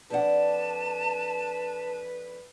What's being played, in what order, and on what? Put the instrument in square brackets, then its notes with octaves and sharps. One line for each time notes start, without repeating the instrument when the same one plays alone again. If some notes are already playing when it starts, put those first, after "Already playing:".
[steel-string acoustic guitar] F2 D4 F#5 [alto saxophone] B4 [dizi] A5